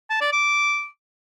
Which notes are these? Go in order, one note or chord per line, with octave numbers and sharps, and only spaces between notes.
A5
D5
D6